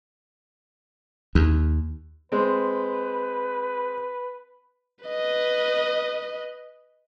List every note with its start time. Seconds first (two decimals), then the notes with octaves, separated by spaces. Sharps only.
1.35 D#2
2.32 G#3 C4 B4
5.05 B4 D#5